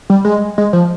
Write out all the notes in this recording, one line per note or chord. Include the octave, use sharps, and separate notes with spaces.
G3
G#3
G#3
F3